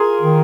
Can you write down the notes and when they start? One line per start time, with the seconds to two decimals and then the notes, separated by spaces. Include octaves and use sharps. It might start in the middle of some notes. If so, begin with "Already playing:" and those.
Already playing: F4 G#4 A#4
0.21 D#3